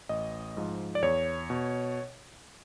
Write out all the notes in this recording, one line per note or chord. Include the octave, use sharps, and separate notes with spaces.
A1 D#5
G#2 F3
D5
E2 C#5
B2